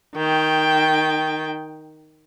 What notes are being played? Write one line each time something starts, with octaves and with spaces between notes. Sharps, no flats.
D#3 G5